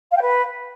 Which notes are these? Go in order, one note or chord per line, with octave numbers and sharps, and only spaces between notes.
F5
G5
B4